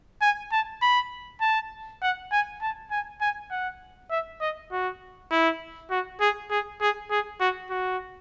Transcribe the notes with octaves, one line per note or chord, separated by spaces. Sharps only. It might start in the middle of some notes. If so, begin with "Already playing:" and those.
G#5
A5
B5
A5
F#5
G#5
A5
G#5
G#5
F#5
E5
D#5
F#4
E4
F#4
G#4
G#4
G#4
G#4
F#4
F#4